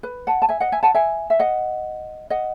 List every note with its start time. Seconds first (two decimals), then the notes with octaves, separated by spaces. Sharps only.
0.03 B4
0.27 F#5 A5
0.42 A5
0.49 E5 G#5
0.60 D#5 F#5
0.72 E5 G#5
0.83 F#5 A5
0.94 E5 G#5
1.30 E5
1.39 D#5 F#5
2.30 D#5 F#5